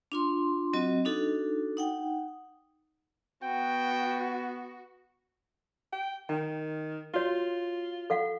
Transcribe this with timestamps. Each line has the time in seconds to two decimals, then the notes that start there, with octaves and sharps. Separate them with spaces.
0.12 D4 F4 C6
0.73 F#3 C4 F#4 D#5
1.05 D4 D#4 F#4 A4
1.77 D#4 F#5 G5
3.43 B3 F#4 G5
5.93 G5
6.29 D#3 G5
7.14 F4 F#4 C#5
8.10 A4 F5 F#5